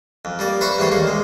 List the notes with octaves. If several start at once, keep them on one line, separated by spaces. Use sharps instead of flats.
F2
G3 A#3 D5
B4 C5 E5 A#5 B5 C#6
E2 G3 A3 C5 C#5
D#2 A#3 C5
G#3